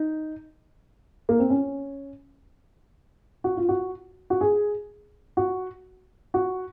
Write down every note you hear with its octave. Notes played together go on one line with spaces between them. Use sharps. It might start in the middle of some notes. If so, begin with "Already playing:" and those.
Already playing: D#4
A#3
C4
C#4
F#4
F4
F#4
F#4
G#4
F#4
F#4